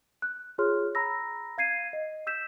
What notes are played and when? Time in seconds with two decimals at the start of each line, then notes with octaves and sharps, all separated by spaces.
0.22 F#6
0.58 F4 G#4 C#5 C6 F6
0.95 A#5 B5 E6 A#6
1.58 F5 G#6 C7 D#7
1.93 D#5
2.27 E6 G6 B6 E7